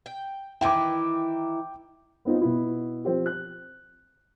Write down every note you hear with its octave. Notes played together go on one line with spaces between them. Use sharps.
G5
D#3 E3 E4 G5 D6
B3 C4 D#4 F4
B2 B3 E4
F3 C4 G4
F#6